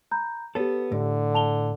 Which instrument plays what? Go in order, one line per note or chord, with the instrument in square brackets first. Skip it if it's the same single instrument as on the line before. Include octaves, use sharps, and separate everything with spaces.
[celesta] A#5 B5 G6
[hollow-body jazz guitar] B3 A4 [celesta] G4 C#5
[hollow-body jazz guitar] A2 [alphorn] D3
[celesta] A5 F7 G7